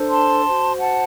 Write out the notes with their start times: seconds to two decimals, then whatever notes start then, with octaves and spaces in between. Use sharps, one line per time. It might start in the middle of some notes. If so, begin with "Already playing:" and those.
Already playing: D4 A4 C5
0.09 A5 C6
0.44 F#4 C5
0.79 F#5 A5